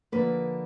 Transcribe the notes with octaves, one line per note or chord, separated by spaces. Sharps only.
D3 F3 A#3 B4